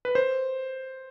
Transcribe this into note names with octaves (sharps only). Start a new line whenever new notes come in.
B4
C5